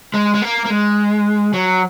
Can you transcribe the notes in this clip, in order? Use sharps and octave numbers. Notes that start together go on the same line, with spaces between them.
G#3
G#3
A#3
A#3
G#3
F#3